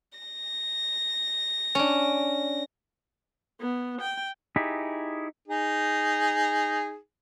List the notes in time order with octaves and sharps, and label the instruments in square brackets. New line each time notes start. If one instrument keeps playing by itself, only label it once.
[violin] A#6
[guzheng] C#4 D4
[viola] B3
G5
[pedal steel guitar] D#4 E4 G4 G#4
[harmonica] D#4 G#4